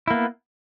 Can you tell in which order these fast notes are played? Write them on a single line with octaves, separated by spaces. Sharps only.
E4 A#3 B3